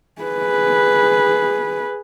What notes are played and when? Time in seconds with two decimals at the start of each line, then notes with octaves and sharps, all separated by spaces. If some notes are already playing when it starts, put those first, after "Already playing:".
0.22 G#4 B4